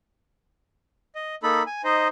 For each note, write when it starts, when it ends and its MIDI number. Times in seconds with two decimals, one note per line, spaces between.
1.15 1.35 75
1.43 1.63 58
1.43 1.63 63
1.43 1.63 69
1.43 1.63 83
1.67 1.82 80
1.84 2.08 63
1.84 2.08 72
1.84 2.08 75